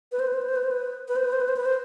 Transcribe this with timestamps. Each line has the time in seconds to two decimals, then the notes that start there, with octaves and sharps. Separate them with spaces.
0.12 B4
0.19 C5
0.27 B4
0.33 C5
0.41 B4
0.48 C5
0.56 B4
0.63 C5
0.71 B4
1.08 B4
1.16 C5
1.24 B4
1.32 C5
1.41 B4
1.48 C5
1.56 B4
1.65 C5